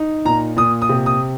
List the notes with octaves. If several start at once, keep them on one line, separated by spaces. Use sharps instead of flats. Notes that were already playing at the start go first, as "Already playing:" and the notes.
Already playing: D#4
A#2 A#5
A#2 D#6
D#6
C3
D#6